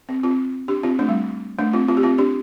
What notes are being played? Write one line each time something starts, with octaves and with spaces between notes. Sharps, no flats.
C4
C4 F4
D4 G4
C4 F4
A3 D4
G3
A3 D4
C4 F4
C4 F4
G4
C4 F4
D4 G4